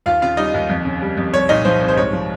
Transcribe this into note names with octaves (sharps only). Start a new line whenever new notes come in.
D#2 F4 F5
C#3 F4 F5
G3 D#4 D#5
D#2
F2
C#3
G3
F2
C2 C#5
A#2 D#4 D#5
F3 C5
C2
C5
G#2 C#5
F3